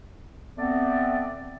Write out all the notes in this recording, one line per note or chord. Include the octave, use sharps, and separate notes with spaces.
A3 B3 C4 D5